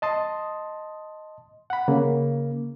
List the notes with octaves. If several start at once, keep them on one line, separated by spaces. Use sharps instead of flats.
D#5 A5 C6 D#6
F#5 B5
C#3 A#3